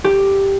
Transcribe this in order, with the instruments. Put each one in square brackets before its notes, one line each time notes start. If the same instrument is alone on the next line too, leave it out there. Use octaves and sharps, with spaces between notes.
[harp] G4